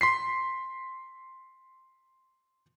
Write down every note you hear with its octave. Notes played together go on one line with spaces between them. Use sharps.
C6 B6 C7